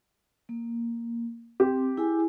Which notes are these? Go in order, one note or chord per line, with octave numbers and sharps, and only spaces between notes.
A#3
C4 G4
E4 G#4 G#5